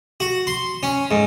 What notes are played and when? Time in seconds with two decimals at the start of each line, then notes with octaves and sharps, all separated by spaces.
0.20 F#4
0.47 C6
0.83 C#4
1.11 G#2